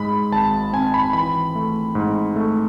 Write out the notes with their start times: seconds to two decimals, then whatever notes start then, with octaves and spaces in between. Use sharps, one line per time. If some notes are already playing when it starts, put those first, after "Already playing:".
Already playing: G#2 G#3 B5
0.32 G#1 A5
0.73 C4 G#5
0.94 B5
1.13 E3 B5
1.55 A3
1.95 G#2
2.36 A3